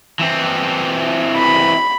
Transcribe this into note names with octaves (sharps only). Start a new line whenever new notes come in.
E3 C4
B5